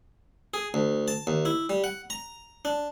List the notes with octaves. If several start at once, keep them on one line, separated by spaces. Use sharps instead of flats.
G#4
D2
A5
D#2
E4
G3
F#5
A#5
D4